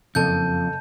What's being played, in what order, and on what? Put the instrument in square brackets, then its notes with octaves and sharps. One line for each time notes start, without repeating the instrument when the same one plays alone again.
[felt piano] F#1 A4 [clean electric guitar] F2 [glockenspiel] A5 G6